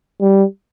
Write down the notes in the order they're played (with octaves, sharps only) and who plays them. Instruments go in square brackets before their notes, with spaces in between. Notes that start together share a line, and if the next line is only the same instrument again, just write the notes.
[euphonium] G3